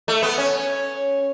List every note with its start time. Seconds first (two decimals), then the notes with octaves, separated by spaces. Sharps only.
0.08 A3
0.23 B3
0.38 C#4